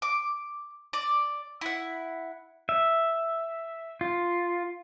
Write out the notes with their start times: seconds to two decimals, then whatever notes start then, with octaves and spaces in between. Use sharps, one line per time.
0.02 D6
0.93 D5
1.61 E4 F#5
2.69 E5
4.01 F4